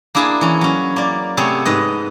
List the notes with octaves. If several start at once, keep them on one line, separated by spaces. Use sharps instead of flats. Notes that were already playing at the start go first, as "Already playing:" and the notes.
A#3 D4 E4 G#4 G#5 A5
E3 C#4
F#3 C#4
A#3 D5
C3 A3 B3 G#4 C#5
G#2 B4 D#5